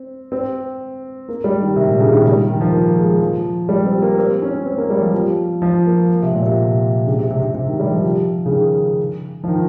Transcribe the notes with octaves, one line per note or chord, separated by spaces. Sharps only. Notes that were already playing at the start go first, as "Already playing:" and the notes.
Already playing: C4
C4
A#3
G3
D#3
C3
A#2
C#3
D#3
G3
D#3
D#3
F3
A#3
G#3
F3
G3
C4
A#3
C4
C#4
C4
A#3
G3
F3
F3
F3
A#3
C3
A#2
C3
C#3
C3
C3
C3
C3
D#3
G3
F3
C#3
D#3
F3
D#3